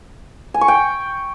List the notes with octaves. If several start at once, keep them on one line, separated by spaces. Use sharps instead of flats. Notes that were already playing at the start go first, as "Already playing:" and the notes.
G#5
C#6
G5